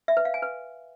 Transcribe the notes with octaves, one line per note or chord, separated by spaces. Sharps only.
E5
B4
F5
G#5
B4